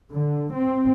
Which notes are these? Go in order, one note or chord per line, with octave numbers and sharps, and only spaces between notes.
D3
C4